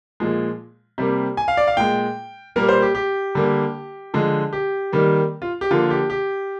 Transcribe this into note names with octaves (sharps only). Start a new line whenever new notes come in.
A#2 F3 G#3
C3 G3 A#3
G#5
F5
D5
F5
A#2 G#3 G5
A#2 G3 A#3 A#4
C5
G4
G4
D3 G3 A#3
D3 F3 G#3
G4
D#3 G3 A#3
F4
G4
D3 F3 A#3 F4
G4
G4